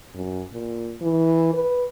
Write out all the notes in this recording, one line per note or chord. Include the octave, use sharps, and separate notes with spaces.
F#2
A#2
E3
B4